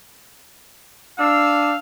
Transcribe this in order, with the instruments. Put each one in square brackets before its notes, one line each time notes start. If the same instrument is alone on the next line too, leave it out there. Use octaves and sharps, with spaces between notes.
[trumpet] D4 [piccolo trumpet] F5 [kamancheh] E6